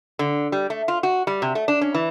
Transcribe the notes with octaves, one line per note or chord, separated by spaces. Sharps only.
D3
G3
A3
F4
F#4
G3
C3
A3
D4
C#4
E3